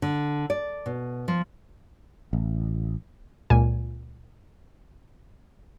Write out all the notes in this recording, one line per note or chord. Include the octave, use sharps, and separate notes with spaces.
D3
D5
B2
F3
A1
C#2 A#2 G#5